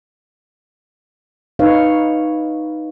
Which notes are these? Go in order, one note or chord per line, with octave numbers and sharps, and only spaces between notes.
D#4 B4 C#5 F5